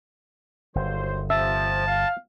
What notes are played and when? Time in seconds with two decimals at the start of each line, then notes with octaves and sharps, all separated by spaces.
0.75 G1 D#3 F#3 C5
1.30 C3 F3 E5 A5
1.86 F5